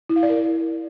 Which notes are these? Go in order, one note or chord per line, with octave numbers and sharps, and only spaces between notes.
E4
F5
D5
A#4